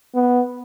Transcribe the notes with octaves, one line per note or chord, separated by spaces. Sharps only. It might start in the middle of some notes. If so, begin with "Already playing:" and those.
B3